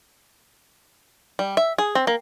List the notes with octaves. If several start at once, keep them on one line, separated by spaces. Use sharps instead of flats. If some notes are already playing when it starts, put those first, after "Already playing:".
G3
E5
G#4
C4
A#3